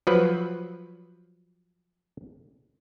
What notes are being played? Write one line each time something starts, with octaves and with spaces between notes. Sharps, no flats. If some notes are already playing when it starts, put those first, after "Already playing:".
F3 F#3 B4